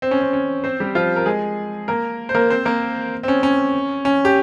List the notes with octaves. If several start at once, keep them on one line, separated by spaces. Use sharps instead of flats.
C4
C#4
C4
C#4
C4 C5
G3 G4
F3 F4
A#4
G#3 G#4
A#3 A#4
C5
A#3 A#4
C4 C5
A#3 A#4
C4
C#4
C#4
C#4
G4